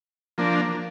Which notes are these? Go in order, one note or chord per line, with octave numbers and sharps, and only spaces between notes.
F3 A#3 D4